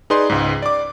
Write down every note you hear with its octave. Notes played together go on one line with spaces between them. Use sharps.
D#4 G#4 B4 D5 C6
C#2 G#2
D5 D6